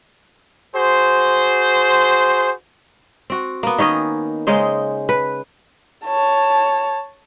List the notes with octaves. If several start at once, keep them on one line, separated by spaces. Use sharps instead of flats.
F#4 G#4 C5
C4 F#4
A#3 B3
D#3 C#4 C#5 D#5
C#3 G#3 D#4 C5
B4
C#5 A5